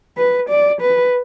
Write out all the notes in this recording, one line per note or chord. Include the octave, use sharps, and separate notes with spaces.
B4
D5
B4